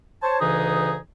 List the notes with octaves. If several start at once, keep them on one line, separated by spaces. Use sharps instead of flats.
C5 C#5 A5
D2 C#3 E3 D#4 G#4 D#6